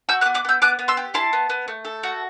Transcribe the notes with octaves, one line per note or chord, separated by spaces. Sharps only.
F#4 E6 G6
D6 F#6
B3
D6 F#6
B3 E6 G6
B3 D6 F#6
B3
C6 E6
G4
E4 A5 C6
B3
B3
A3
A4
F#4